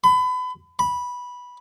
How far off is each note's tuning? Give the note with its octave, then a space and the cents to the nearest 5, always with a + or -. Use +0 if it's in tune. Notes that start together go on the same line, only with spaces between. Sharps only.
B5 +30
B5 -10